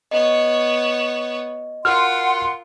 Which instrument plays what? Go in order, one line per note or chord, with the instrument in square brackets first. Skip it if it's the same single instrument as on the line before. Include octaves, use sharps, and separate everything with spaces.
[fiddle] B3 C#5 [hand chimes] D#5
[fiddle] F4 [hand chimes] F#4 A#4 [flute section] F#5 C6 [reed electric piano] F6